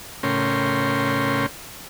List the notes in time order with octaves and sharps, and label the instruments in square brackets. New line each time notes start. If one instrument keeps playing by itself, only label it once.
[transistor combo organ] A2 C#3 C#4 A#4 G5 C6